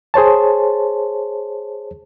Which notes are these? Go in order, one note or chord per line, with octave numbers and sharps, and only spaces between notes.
G#4 C5 C#5 A5